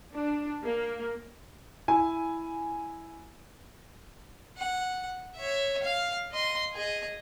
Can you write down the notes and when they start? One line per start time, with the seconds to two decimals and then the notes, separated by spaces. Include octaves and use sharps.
0.14 D4
0.63 A#3
1.88 E4 G#5
4.58 F#5
5.36 C#5 E5
5.83 F5
6.32 D#5 C6
6.74 G#4 D#5